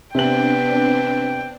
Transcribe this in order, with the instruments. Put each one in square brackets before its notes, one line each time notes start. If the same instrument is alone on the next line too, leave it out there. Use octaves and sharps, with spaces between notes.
[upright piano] C3 F#7 [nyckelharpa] B3 B4 [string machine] C4 D4 [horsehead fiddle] G5